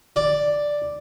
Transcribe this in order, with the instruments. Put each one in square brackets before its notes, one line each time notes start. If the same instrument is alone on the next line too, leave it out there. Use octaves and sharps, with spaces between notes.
[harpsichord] D5